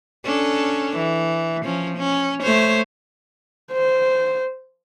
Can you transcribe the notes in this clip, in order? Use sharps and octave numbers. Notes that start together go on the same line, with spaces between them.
C#4 D4 A4
E3
F3 C#4
C#4
A3 C5 C#5
C5